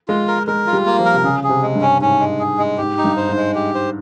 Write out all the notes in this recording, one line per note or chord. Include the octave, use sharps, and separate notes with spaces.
G#3 F4
A#4
G#3 A#4
F4
G3
A#3
F3
A#4
C3
C#3 G#4
G#4
C3
G#3
G2
C#4
G#2 C#4
G#3
G#4
G#3
G#2 G4
D#4
G2
C5
G#2
G#3
G4
C5